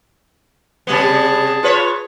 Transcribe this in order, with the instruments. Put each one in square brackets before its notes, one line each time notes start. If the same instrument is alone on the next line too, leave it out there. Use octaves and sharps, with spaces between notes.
[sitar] C3 G3 B3 [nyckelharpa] G#4 A5
[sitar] F4 B4 C#5